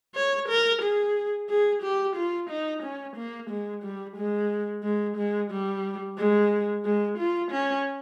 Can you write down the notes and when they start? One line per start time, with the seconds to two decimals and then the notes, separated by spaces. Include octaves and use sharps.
0.15 C#5
0.49 A#4
0.82 G#4
1.49 G#4
1.82 G4
2.16 F4
2.50 D#4
2.83 C#4
3.16 A#3
3.50 G#3
3.83 G3
4.17 G#3
4.83 G#3
5.17 G#3
5.51 G3
6.18 G#3
6.85 G#3
7.18 F4
7.52 C#4